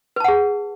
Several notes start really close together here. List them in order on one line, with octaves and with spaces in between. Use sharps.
B4 A5 F#5 G#4